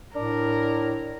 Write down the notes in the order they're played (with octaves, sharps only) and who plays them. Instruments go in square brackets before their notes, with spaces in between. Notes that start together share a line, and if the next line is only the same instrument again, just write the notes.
[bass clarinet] A2 [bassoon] D4 [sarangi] A#4